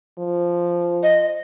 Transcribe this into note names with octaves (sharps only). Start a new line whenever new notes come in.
F3
D#5